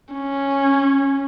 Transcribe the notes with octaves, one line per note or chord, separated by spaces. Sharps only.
C#4